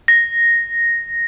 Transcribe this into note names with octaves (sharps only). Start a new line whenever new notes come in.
A#6